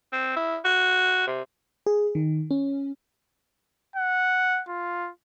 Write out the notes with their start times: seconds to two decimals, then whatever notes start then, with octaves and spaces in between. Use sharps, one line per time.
0.12 C4
0.36 E4
0.65 F#4
1.27 C3
1.87 G#4
2.15 D#3
2.51 C#4
3.96 F#5
4.68 F4